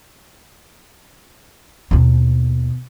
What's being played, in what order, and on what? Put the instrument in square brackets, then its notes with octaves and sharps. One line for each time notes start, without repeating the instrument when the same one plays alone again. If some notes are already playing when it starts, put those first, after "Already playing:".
[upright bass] D#2 B2